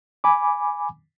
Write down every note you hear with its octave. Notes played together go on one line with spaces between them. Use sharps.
G#5 B5 D6